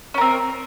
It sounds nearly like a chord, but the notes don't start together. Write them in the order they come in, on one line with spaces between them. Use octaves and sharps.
C#4 A#4 C4